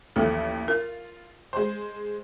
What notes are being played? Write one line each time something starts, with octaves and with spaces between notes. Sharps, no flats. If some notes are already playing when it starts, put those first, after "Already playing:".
A1 D#2 F3 A4
F4 A#4
G#3 C5